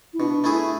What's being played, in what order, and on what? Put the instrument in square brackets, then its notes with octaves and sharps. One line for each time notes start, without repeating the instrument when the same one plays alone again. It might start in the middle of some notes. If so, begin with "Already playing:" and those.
[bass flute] E4
[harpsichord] B2 [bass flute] D4
[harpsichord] A3 E4 G#4